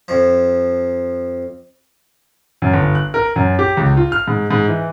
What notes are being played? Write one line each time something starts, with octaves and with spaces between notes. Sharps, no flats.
F2 F3
F#2
G1
F#6
A#4
F#2
G4
C#2
F4
F6
G#2
G#2
E3